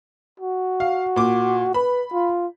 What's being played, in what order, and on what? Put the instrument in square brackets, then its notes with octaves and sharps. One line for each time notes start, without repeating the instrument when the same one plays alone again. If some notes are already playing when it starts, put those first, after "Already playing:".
[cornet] F#4
[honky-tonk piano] F5
A#2 D6
[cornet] B4 [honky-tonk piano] B5
[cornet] F4